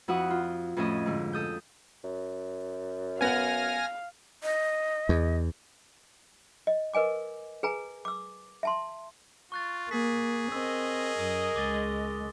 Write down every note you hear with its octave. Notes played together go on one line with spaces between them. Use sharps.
F2 E4 F#4 F#5 D#6
F4
F2 A2 C#4 A4 D#5
G#2 D3
A4 D#6 G6
F#2
B3 F5 F#5 G#5 F6 A#6
D#5
E2
D#5
A#4 B4 D#5 G#5 D6
G#4 B4 G#5 A#5
D6 E6
E5 A5 C6
F4 C#6 F#6 A6
A#3 G#4 B6
C4 A#4 D#5 E6
F#2 D#6
C#2 G#3 D6 A6 G7